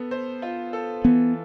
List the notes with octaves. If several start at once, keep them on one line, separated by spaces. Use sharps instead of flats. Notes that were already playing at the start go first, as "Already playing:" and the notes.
Already playing: B3 A4
C5
F4
A4
E3 B3